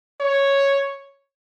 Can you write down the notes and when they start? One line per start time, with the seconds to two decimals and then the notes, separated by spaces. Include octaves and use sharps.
0.20 C#5